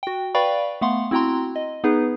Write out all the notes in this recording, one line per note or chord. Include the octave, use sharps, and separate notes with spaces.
F#4 G5
B4 D5 F5 G5 B5 C#6
A3 B3 F5 F#5 C6
C4 E4 F#4 G5 A#5 C6
D#5
B3 D#4 G#4 B4